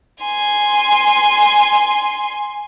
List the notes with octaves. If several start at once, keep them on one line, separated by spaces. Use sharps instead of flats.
G#5 C6